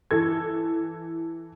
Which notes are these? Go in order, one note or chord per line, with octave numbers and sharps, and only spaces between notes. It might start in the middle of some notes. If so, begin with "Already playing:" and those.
E3 A4 G#6